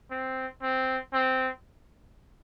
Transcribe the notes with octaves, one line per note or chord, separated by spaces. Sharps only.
C4
C4
C4